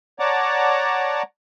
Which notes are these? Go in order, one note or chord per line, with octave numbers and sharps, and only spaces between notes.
C#5 D5 F#5 A5 A#5 D6